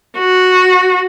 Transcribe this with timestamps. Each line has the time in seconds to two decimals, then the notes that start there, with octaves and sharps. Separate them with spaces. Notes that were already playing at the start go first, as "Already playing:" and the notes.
0.18 F#4